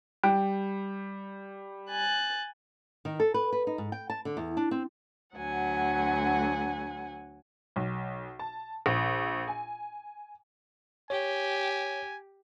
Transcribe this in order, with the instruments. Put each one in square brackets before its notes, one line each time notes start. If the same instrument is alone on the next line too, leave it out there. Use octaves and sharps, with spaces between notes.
[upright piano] G3 [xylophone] G5
[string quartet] G#5 F#6 A6
[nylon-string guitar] D#3
A4
B4
B4
D#4
G#2
G5
A5
D3
E2
D4
C4
[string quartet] D2 F#3 F#5 G#5
[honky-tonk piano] B1
A5
A#1
G#5
[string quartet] G4 [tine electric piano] C#5 [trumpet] G#5